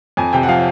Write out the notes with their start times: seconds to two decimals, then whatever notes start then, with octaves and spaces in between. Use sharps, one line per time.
0.17 F2 G#5
0.33 C3 G5
0.43 F#5
0.48 F3 F5